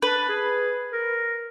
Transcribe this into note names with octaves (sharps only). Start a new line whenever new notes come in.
D4 B4
G#4
A#4